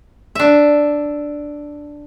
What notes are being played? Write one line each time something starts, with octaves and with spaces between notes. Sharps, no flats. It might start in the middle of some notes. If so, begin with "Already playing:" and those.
D4 E5